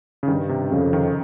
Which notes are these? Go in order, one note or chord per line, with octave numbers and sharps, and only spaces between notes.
C#3
G2 D#3
C3
F2 C#3
D#3